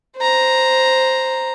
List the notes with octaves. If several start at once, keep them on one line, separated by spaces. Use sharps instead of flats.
C5 A#5